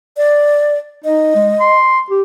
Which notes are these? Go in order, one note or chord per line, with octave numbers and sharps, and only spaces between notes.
D5
D#4 D#5
G#3
C6
G4